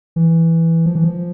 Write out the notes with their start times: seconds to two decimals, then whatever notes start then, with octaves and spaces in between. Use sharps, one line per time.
0.16 E3
0.86 F3
0.95 E3
1.04 F3